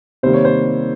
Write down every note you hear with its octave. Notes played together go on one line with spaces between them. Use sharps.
C3 D#3 G3 A#3 C5
C#5
C5